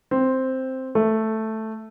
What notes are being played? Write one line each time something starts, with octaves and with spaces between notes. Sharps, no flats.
C4
A3